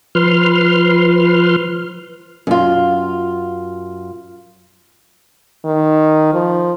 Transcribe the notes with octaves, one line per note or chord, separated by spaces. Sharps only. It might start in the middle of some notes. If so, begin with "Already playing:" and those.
F3 B4 C6 F6
F#2 F4
D#3
F3